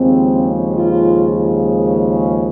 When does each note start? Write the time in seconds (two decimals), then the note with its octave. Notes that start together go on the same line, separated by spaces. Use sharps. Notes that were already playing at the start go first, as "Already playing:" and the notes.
Already playing: D#2 C#3 F3 G#3 C4
0.71 F4